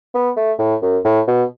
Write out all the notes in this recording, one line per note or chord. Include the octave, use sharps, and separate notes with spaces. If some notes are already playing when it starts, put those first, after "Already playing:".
B3
A3
A2
F#2
A2
B2